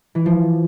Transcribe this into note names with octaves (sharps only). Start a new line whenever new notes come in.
E3
F3